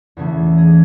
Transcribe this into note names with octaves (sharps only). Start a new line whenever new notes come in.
E2 C#3 E3 A3
G#4